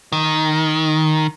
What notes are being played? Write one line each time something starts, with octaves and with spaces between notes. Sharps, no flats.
D#3